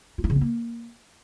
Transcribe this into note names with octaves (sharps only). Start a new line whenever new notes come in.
F4
E4
C#3
C4
A#3